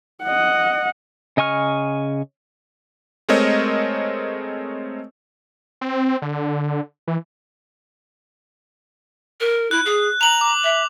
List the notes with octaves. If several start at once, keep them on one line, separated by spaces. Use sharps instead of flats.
D#5 F#5
C#3 D#5 G#5 C#6 F6
G#3 A3 C4 A#4 C#5 D#5
C4
D3
E3
A#4
E4 F#6
G#4
A#5 F7 F#7
D6
E5